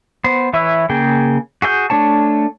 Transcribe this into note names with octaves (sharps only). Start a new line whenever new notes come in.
B3 C5
E3 E4 B4 C#5 E5
C#3 A#3 G#4 G5
F#4 G#4 D#5 G6
A3 D4 C#5 A5